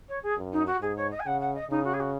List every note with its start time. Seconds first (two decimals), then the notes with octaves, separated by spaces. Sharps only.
0.08 C#5
0.23 G#4
0.37 F#2
0.52 D#4
0.66 F#4
0.81 G#2 G#4
0.97 C#5
1.11 D#5
1.19 G#5
1.26 C#3 F#5
1.40 F#5
1.54 D#5
1.70 C#3 D#4
1.84 F#4
1.93 G#4
2.00 F#4